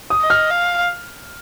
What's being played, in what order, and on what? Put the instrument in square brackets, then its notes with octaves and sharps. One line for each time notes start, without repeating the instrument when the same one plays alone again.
[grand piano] D#6
[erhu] D#5
[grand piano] F6
[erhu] F5